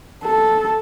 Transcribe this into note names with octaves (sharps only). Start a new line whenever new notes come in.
A4